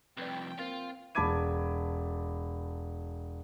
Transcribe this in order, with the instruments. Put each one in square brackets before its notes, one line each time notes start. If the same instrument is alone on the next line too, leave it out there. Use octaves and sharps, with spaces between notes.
[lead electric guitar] C2 F2 [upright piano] B4 D5 [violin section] G5
[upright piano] A#3 C4 [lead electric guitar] F4
[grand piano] E1 A5 B5 D6 G#6 D#7